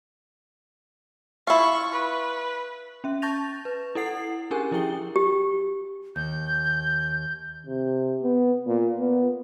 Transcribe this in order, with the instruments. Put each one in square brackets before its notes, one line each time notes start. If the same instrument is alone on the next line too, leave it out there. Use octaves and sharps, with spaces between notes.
[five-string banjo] E4 F4 [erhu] C#6
[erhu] B4
[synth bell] C#4 E5
A5 C#6 G6 A6 A#6 F7
B4
E4 A4 F#5 C7
C#4 D4 G4 G#4 A#4 G#5
F3 E4 G#4 G5 G7
[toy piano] G4
[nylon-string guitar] D#2 [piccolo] G6
[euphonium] C3
B3
A#2
B3